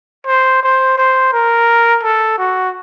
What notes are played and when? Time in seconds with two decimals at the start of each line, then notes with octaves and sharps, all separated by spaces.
0.27 C5
0.63 C5
0.97 C5
1.32 A#4
2.03 A4
2.38 F#4